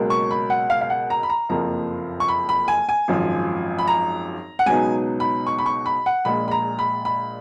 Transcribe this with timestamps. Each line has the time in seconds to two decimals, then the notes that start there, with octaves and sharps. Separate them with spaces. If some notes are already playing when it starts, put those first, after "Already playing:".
Already playing: C#2 B2 F#3 A#3
0.10 C#6
0.31 B5
0.50 F#5
0.70 F5
0.81 F5
0.90 F#5
1.10 A#5
1.23 B5
1.30 A#5
1.49 F#1 F2 F3 A#3 A#5
2.20 C#6
2.29 B5
2.49 B5
2.68 G#5
2.89 G#5
3.08 G#1 F#2 F3
3.79 B5
3.88 A#5
4.59 F#5
4.66 C#2 B2 F#3 B3 D#4 G#5
5.20 B5
5.47 C#6
5.58 B5
5.66 C#6
5.86 B5
6.06 F#5
6.25 A#1 A#2 G#3 B5
6.48 B5
6.51 A#5
6.79 B5
7.05 B5